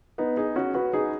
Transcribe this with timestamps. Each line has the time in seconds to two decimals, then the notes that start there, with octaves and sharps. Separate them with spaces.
0.18 B3 D#4
0.37 D#4 G#4
0.56 C#4 F#4
0.74 F#4 B4
0.93 D#4 G#4